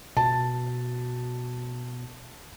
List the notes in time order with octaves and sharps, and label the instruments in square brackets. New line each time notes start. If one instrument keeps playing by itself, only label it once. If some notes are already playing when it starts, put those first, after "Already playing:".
[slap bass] B2 [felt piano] A5